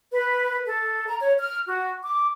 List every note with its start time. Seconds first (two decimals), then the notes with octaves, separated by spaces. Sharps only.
0.11 B4
0.65 A4
1.06 A#5
1.20 C#5
1.38 F6
1.65 F#4
2.03 D6